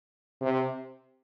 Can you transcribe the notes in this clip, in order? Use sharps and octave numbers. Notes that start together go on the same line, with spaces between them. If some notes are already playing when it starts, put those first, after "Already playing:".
C3